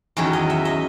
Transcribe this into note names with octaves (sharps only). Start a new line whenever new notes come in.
E2 D#3 F#3 C#4 C#5
D#5
E5
D#5